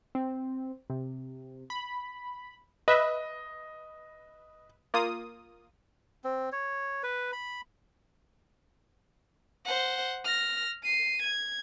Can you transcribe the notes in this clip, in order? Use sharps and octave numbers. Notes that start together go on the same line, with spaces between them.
C4
C3
B5
B4 D#5 E5
A#3 F4 D#6
C4
C#5
B4
B5
C5 F#5
F6 A#6
C7 D#7
G#6